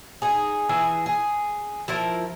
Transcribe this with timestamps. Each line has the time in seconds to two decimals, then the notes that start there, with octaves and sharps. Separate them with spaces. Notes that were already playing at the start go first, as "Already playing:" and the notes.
0.22 D#4 G#4
0.69 E3 G#4 E5
1.06 G#4
1.88 F3 E4 A#4